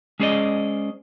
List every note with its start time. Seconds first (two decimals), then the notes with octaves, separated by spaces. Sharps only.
0.19 G#3 C#4 G#4 C5 D5 D#5